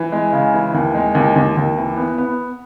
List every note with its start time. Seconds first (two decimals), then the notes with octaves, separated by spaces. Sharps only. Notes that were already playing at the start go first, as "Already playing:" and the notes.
Already playing: E3
0.12 G#3
0.33 C#3
0.54 E3
0.74 D#2
0.95 G#3
1.15 D#2
1.36 D#2
1.57 D#2
1.78 E3
1.97 B3
2.18 B3